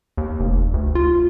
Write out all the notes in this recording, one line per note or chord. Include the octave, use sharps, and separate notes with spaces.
D#2
F1
D2
F4